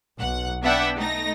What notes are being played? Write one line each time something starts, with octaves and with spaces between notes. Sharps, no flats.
B1 F#5
B3 D4 E5 F#5 G5
A3 D#4 A#6